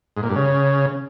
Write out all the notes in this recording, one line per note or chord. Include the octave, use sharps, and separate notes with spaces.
G#2
A#2
G2
C#3